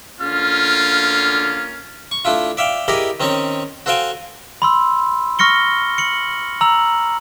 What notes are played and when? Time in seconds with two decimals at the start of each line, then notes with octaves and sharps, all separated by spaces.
0.21 D3 A#3 C#4 F4 F6
2.11 C#6
2.25 A3 D4 E4 F4
2.57 D5 E5 F5 G5
2.88 E4 G4 G#4 A#4 D5 D#5
3.20 D#3 C4 C#4 D#4 C#5
3.86 F#4 A4 C5 F5 G5 G#5
4.62 B5 C6 E6
5.39 C#6 F6 A#6 C#7 G7
5.98 C#7 F#7
6.61 A#5 E6 F#7